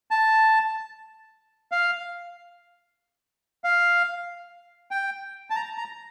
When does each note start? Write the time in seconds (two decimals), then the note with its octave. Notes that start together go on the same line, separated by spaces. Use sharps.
0.11 A5
1.72 F5
3.64 F5
4.91 G5
5.50 A5
5.56 A#5
5.78 A#5